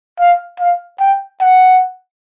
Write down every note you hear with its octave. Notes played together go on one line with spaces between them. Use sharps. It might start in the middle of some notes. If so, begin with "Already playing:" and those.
F5
F5
G5
F#5